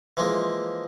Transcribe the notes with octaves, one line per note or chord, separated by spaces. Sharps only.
E3 F3 G#3 A#3